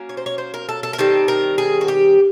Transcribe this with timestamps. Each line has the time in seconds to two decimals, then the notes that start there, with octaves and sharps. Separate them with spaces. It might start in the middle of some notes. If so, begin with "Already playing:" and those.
Already playing: F#3 A#3 C#4
0.09 C#5
0.17 C5
0.26 C#5
0.38 C5
0.54 A#4
0.69 A4
0.83 A4
0.93 A#4
0.98 D#3 G3 C4 A4
1.28 A#4
1.58 G#4
1.81 F#4
1.88 G4